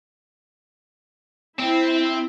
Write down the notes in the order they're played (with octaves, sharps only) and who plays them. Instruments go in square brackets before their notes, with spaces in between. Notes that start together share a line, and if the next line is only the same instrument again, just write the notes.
[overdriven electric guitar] C4 [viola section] E4 E5